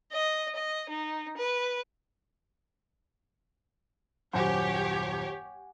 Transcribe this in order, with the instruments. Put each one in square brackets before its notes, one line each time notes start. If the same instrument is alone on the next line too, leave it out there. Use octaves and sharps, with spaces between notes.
[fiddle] D#5
D#5
D#4
B4
[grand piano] D#1 F#2 C5 [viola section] G4 C#5 [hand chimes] F#5 G#5